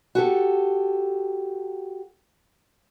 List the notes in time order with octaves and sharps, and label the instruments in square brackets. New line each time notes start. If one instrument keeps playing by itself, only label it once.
[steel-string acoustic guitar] F#4 G4 A4